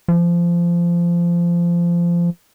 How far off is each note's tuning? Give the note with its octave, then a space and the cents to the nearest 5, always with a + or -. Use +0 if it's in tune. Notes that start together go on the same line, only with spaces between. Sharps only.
F3 -20